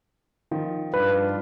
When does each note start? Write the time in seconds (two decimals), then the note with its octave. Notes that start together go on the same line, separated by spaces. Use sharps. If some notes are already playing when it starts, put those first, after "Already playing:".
0.51 D#3 F3
0.94 G2 D4 F4 B4